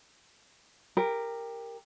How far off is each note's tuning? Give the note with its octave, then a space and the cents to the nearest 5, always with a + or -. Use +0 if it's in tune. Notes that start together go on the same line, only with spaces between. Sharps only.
G4 +20 A#4 -5